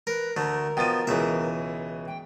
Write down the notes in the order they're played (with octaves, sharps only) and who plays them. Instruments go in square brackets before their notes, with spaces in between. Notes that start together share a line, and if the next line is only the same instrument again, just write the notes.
[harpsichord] A#4 [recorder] B4
[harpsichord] D2 A3 [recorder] A#4
[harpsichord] B2 F3 [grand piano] G5 A6 D#7
[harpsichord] C#2 E5 [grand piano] B2 E3
[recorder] G5